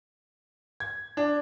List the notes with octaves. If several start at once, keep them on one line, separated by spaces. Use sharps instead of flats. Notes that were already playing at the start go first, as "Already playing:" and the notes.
G#6
D4